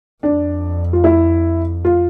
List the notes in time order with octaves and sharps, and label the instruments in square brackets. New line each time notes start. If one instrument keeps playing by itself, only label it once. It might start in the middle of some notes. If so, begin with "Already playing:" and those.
[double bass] F2 [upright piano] D4
[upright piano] F4
E4
F4